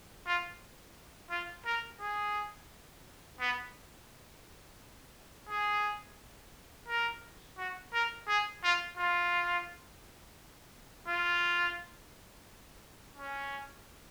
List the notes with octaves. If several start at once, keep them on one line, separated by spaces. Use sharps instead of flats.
F4
F4
A#4
G#4
B3
G#4
A#4
F#4
A#4
G#4
F4
F4
F4
C#4